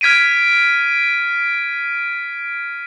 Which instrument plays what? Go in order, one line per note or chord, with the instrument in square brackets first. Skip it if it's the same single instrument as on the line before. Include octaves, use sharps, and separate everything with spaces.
[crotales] F6 G#6 B6 D7 D#7